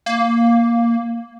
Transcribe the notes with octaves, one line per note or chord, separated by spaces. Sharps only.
A#3